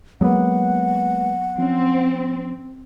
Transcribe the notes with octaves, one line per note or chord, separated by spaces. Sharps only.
F#3 G#3 A#3 B3 B4 F#5
F3 C4 C#4